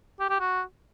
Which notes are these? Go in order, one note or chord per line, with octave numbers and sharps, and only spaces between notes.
G4
G4
F#4